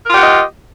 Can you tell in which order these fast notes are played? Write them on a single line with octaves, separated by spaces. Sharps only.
A#4 F4 G4 F#5 D#5